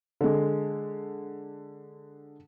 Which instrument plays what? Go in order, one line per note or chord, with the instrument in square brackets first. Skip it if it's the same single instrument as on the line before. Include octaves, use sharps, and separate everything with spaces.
[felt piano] D3 G#3